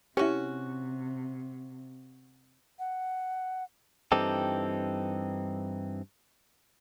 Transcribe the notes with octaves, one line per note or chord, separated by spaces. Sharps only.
C3 C#4 E4 F#4 G4
F#5
G2 E3 C4 D#4 G4 A4